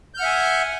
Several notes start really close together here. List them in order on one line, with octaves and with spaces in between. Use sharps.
G6 F6 F#5 E5 G#5